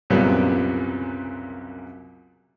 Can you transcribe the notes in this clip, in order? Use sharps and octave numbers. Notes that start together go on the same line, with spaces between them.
C2 F#2 A#2 C#3 G3 B3